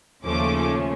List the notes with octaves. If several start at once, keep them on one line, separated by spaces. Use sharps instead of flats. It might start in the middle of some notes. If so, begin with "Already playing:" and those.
D#2 C#3 F3 A3 C#4 D6